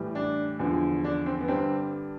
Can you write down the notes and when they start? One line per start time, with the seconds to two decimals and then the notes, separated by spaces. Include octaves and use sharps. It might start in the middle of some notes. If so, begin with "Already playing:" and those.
Already playing: A2 E3 G3
0.15 D4
0.59 E2 D3 F3
1.04 D4
1.26 C4
1.40 B3
1.48 G2 D3 G3 C4